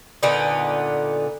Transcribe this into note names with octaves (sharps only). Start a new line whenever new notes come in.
A#2 D3 B3 D#4